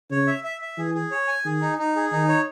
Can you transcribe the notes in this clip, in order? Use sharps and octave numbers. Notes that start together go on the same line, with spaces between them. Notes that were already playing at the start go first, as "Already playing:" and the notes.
C#3 C#5
E5
E5
E5
E3 G#4
G#4
C#5
G#5
D#3 G#4
D#4
D#4
G#4
D#3 D#4
C#5